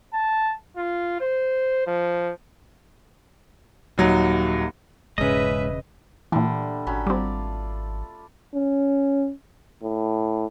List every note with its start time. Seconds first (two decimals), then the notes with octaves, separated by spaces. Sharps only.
0.13 A5
0.77 F4
1.21 C5
1.87 F3
3.98 D#1 F#3 D#4
5.18 E1 G#2 C#3 C#4 B4 D#5 E5
6.32 A#2 D3 E3 G3 A3
6.87 G#1 F#3 C#4 B5
7.07 G3 C4 F4 D5
8.54 C#4
9.83 A2